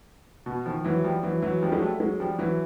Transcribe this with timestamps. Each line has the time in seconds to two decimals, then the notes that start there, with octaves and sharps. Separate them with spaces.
0.46 B2
0.66 D#3 F3
0.85 E3 F#3
1.04 F3 G3
1.23 E3 F#3
1.42 E3 F#3
1.62 F3 G3
1.72 F#3 G#3
1.81 G3 A3
2.00 F#3 G#3
2.20 F3 G3
2.39 E3 F#3